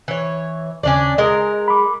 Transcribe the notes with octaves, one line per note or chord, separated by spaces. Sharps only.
E3 C#5
D#2 C#3 C#4 D4 D5
G#3 A#4 D#5
B5 D6